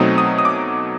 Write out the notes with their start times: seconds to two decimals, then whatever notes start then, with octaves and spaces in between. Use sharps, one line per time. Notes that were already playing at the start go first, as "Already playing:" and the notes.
Already playing: B2 F#3 A3 C4 D#4 D#6
0.18 D#6
0.38 D#6
0.45 D6